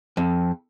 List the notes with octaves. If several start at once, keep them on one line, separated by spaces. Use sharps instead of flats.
F2